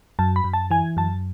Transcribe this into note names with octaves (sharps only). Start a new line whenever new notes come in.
F#2 A5
B5
F#2
A5
E3 G#5
F#2 A5